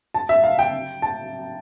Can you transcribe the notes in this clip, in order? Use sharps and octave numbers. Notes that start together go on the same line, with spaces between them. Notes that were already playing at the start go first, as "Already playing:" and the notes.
A5
E5
F5
G5
A5